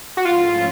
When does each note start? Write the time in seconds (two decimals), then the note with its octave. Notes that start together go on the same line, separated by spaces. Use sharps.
0.17 F#4
0.24 G#2 F3 A3 C#4 E4 F4